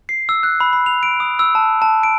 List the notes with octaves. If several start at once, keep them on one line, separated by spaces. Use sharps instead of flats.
C7
E6
F#6
B5
B5
F7
D7
D#6
E6
A5
A5
D7